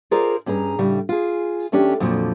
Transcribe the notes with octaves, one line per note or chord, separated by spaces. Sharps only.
F4 G#4 A#4 C5 D5
G2 C#4 G#4 A#5
A2 C#3 G3
F4 G#4
E2 A3 C#4 D4 G4
F2 A#2 D3 F3 F#3